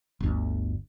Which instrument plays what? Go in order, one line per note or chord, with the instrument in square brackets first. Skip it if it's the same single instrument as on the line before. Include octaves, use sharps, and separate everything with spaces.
[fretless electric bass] G1 D2